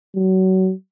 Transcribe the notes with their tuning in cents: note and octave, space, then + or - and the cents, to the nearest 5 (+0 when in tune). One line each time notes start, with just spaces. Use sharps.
F#3 +25